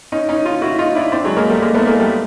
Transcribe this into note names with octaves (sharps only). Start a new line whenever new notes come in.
C#4 D#4
C#4 D#4
D#4 F4
E4 F#4
D#4 F4
D4 E4
C4 D4
F#3 G#3
G#3 A#3
G3 A3
G#3 A#3
A3 B3
G#3 A#3
G3 A3